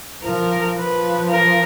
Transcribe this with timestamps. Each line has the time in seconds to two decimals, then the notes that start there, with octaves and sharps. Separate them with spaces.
0.23 F3 A#4
0.77 F3 B4
1.29 A#4